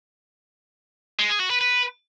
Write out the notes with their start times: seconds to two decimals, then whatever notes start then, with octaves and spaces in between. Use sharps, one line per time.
1.19 G#3
1.30 G#4
1.40 F#4
1.50 B4
1.61 B4